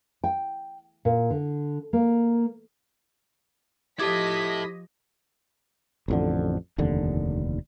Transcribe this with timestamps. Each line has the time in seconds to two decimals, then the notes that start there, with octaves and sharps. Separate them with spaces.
0.24 G5
1.05 A#2
1.30 D3
1.93 A#3
4.00 F3 E4 G4 A4 D#5 D6 G#6 B6
6.08 A1 F2 D3
6.78 F1 D#2 D3